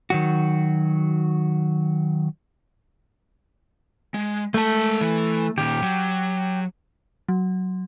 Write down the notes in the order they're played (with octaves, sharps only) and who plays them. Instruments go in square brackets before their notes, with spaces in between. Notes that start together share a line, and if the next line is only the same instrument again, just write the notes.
[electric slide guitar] D#3 F#3 F#4
[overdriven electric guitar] G#3
[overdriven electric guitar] G#3 A5 [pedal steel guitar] A3
[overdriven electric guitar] E3
[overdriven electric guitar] A#2 D#3 [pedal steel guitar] G4
[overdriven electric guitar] F#3
[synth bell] F#3